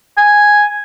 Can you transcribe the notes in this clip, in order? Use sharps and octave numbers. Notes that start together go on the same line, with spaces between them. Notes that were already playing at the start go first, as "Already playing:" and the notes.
G#5